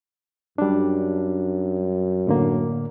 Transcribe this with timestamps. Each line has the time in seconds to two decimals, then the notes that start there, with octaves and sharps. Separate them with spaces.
0.58 F#2 G3 D4
2.27 A2 D3 A#3